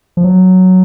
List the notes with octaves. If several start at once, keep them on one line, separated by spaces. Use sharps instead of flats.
F3
F#3